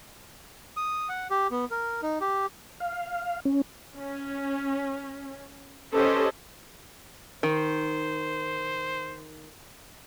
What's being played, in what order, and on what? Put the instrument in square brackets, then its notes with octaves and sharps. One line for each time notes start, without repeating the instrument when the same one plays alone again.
[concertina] D#6
F#5
G4
B3
A#4
D#4
G4
[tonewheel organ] F5
C#4
[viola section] C#4
C#4 G4 A4 B4 C5 D#5
[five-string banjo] D#3 [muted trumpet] C5